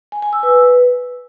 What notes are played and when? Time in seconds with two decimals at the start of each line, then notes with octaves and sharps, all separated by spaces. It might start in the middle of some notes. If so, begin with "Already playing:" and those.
0.12 G#5
0.22 G#5
0.33 E6
0.43 B4